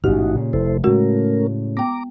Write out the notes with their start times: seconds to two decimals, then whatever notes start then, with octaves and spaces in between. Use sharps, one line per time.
0.04 A1 G#2 B2 D#4 F#4 G4
0.35 A#2 C#3
0.53 F1 E4 A4 C5
0.84 A2 C#3 G#3 A3 C#4 F#4 A#4
1.77 B3 G5 A#5 D6